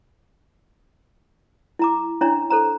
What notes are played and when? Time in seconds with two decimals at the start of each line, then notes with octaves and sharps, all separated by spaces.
1.79 E4 A#5 D6
2.21 C#4 D4 E4 C#5 A#5
2.50 A4 C5 A#5